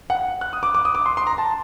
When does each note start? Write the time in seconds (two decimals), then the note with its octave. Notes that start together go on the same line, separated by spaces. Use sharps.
0.10 F#5
0.41 F#6
0.53 D#6
0.63 D6
0.74 D6
0.85 D#6
0.95 D6
1.06 C6
1.17 C6
1.27 A#5
1.38 A5